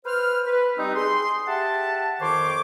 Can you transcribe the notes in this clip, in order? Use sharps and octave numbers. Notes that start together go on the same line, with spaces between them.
B4 C5 F6
B4
G3 C4 D#4
G#4 C6
G4 E5 F#5 A5
F2 D#3 C5 C#5 C6 D6